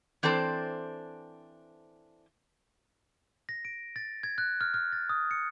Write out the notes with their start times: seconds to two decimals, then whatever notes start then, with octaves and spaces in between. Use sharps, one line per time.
0.23 E3 C4 D4 A4 C5
3.49 A#6
3.65 D7
3.96 A6
4.23 G#6
4.38 F#6
4.61 F6
4.74 F6
4.92 A6
5.09 D#6
5.31 C#7